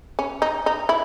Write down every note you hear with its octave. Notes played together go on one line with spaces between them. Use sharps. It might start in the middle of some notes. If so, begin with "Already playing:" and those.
C#4
D#4
D#4
E4